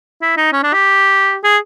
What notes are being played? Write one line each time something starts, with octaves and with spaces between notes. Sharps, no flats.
E4
D#4
C#4
D4
G4
G#4